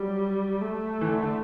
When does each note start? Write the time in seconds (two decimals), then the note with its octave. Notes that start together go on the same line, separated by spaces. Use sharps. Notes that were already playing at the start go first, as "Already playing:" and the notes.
Already playing: F#3 G3
0.61 A3
1.01 E3
1.07 D3
1.23 D3